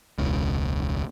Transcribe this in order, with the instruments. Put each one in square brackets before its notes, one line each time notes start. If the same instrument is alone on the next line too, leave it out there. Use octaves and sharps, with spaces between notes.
[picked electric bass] E1 C#2